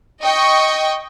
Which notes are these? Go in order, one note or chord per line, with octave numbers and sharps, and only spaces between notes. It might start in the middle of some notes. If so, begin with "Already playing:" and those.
D#5 G5 C#6